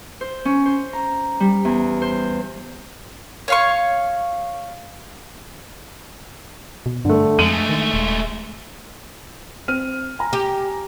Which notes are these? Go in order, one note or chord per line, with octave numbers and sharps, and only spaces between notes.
C5
C#4
C5
A#5
G3
E2
C5
C#5 F5 C#6
B2
G2 D3 A3
F2 G#3 A3 D#7 F#7
D#3
D#1
C4 F6 D#7
G#5 A#5
G4